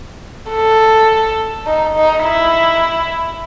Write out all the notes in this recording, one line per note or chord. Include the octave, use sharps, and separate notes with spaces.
A4
D#4
D#4
E4